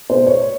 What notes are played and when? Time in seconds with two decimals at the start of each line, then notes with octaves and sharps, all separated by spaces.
0.10 B2 C5
0.27 C#5